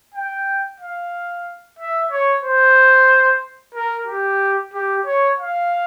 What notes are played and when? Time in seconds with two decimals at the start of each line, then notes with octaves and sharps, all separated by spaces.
0.14 G5
0.80 F5
1.79 E5
2.11 C#5
2.43 C5
3.74 A#4
4.07 G4
4.74 G4
5.06 C#5
5.38 F5